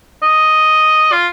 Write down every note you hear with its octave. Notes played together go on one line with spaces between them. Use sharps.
D#5
F4